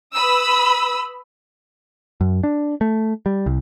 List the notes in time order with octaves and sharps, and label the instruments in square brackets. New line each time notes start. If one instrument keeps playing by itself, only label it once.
[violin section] B4 B5 D#6 E6
[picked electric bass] F#2
D4
A3
G3
C2